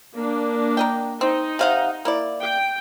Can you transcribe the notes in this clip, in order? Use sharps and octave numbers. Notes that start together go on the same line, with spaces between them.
A#3 D4
A#4 D#5 G5
C4 D#4
C3 F5 F#5
A#3 E4 D5
G5